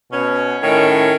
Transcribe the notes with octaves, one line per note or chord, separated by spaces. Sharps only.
B2 C#4
A2 D#3 C#4